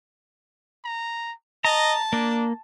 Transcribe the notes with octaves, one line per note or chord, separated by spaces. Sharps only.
A#5
D#5 A5 A#5
A#3 D4